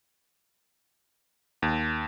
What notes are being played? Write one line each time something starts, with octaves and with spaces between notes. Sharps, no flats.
D#2